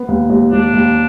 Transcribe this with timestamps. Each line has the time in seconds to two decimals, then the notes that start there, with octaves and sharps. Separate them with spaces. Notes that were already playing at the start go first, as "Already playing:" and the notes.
Already playing: B3
0.08 D#2
0.29 D#2
0.52 D#2 D4
0.73 D#2